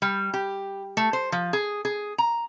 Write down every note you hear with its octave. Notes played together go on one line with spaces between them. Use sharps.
G3
G4
A3
C5
F3
G#4
G#4
A#5